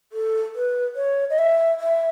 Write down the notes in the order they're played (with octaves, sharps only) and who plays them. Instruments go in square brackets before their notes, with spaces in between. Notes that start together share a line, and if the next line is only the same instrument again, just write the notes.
[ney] A4
B4
C#5
D#5
E5
E5